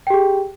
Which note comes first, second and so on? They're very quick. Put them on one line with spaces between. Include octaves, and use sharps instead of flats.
G5 G4 G#4